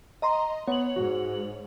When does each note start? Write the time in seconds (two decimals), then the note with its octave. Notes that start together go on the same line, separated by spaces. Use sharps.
0.22 D#5 A#5 C6
0.67 B3 C#5 F#7
0.96 G#2 F#4